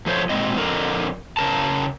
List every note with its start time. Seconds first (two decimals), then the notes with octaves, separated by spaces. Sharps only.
0.06 F3 A3 C5 C#5
0.29 A#2 G#3 C4 D#5
0.56 F2 D3 A#4
1.37 C#3 A#4 A5